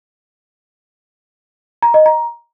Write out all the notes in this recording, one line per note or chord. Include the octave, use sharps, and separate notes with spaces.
A#5
D#5
A#5